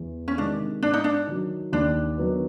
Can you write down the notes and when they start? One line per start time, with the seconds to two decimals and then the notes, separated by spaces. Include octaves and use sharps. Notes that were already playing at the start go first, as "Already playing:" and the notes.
Already playing: E2
0.28 C#4
0.38 C3 D#3 G#3 D4
0.83 G#2 D4
0.94 D#4
1.04 D4
1.27 D#3 F#3
1.73 D#2 D4
2.18 D#3 F#3 B3